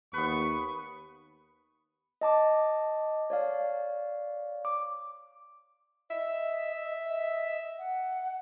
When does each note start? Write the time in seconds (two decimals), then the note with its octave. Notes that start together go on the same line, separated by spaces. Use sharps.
0.14 D#2 B3 B4 C#6
2.21 D#5 A5 D6
3.30 C#5 D5 F5
4.65 D6
6.11 D#5 E5
6.32 D#5
7.08 D#5
7.79 F#5